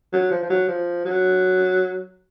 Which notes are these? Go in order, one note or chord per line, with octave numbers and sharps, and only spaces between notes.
F#3
F3
F3
F#3
F3
F#3